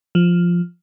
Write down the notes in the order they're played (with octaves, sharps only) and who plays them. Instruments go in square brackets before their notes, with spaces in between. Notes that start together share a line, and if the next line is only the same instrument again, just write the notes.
[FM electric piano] F3